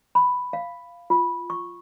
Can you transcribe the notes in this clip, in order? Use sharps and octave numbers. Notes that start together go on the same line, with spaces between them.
B5
F5
F4
C#6